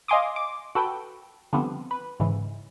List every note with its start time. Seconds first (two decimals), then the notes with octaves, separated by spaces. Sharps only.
0.08 D#5 F5 G#5 C6 D6 D#6
0.36 D6
0.75 F#4 A4 B4 G5
1.53 D3 F3 G3 B3 C4
1.91 B4
2.20 G#2 C#3 E3